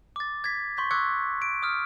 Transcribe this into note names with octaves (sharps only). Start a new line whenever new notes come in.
D6 A6
G#6 A6 B6
C6 C#6 G6 B6
C#6 D6 E6 F#6 G#6 C#7
D7
D#6 F6